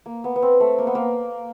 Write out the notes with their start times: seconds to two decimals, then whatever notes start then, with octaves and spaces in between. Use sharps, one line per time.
0.06 A#3
0.24 B3
0.36 B3
0.42 C4
0.60 A3
0.79 A#3
0.87 B3
0.95 A#3